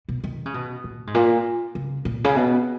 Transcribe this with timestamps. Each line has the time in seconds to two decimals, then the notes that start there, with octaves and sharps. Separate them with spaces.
0.09 B2
0.24 D#3
0.46 C#3
0.54 B2
0.84 A#2
1.07 G#2
1.14 A#2
1.75 C#3
2.05 A#2
2.24 C#3
2.36 B2